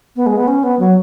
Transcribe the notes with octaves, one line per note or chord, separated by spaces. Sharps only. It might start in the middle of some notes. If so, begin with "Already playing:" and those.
B3
G#3
B3
C#4
B3
F#3